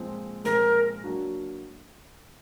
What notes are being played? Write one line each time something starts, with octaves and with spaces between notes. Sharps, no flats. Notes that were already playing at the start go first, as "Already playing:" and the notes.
Already playing: A#2 F3 G#3 C4
A#2 F3 G#3 C4 A#4
F#3 A#3 D4 F#4